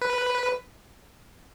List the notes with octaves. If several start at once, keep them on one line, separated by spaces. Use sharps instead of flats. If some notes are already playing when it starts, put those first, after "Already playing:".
B4